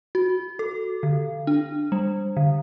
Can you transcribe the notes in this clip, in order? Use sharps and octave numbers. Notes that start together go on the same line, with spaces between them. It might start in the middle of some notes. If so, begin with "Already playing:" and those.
F#4
A4
D3
D4
G3
D3